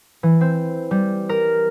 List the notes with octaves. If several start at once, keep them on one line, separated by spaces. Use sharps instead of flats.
E3
C4
G3
A#4